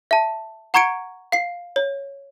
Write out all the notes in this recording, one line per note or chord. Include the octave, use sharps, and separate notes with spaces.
E5 A5
F#5 A#5 C#6 G#6 C#7 D7
F5 C7
C#5